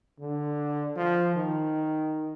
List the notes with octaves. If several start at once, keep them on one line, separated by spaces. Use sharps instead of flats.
D3
F3
D#3